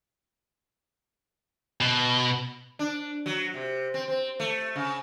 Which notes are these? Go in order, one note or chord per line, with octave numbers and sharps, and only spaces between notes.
B2
D4
F#3
C3
C4
C4
A3
C#3